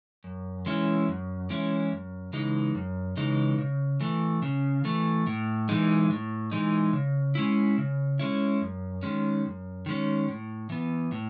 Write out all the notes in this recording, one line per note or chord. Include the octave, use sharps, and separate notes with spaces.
F#2
E3 G#3 C#4 E4
F#2
E3 G#3 C#4 E4
F#2
C#3 E3 G#3 D#4
F#2
C#3 E3 G#3 D#4
C#3
E3 A3
C#3
E3 A3
A2
E3 G#3 D#4
A2
E3 G#3 D#4
C#3
G#3 C#4 E4
C#3
G#3 C#4 E4
F#2
D#3 G#3 C#4
F#2
D#3 G#3 C#4
A2
E3 B3
A2